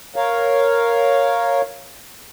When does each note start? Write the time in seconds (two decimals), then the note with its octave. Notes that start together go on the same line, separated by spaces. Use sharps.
0.16 A#4 C#5 F5